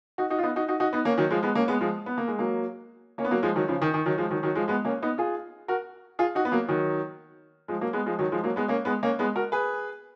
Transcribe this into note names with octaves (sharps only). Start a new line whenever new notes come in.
D#4 F#4
D#4 F#4
F4
B3 D#4
D#4 F#4
D#4 F#4
D#4 F#4
B3 D#4
A#3 C#4
D#3 F#3
F3 G#3
G#3 B3
A#3 C#4
G#3 B3
F3 G#3
B3
A#3
G#3
F#3 A#3
A#3 C#4
B3
F#3 A#3
F3 G#3
D#3 F#3
C#3 F3
D#3
D#3
D#3 F#3
F3 G#3
D#3 F#3
D#3 F#3
F3 G#3
G#3 B3
A#3 C#4
B3 D#4
F4 G#4
F#4 A#4
F4 G#4
D#4 F#4
B3
F#3 A#3
D#3 F#3
F3 G#3
F#3 A#3
G#3 B3
F3 G#3
D#3 F#3
F3 G#3
F#3 A#3
G#3 B3
A#3 C#4
G#3 B3
A#3 C#4
G#3 B3
F#4 A#4
G#4 B4